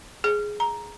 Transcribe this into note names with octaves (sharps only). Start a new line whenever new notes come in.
G#4
A#5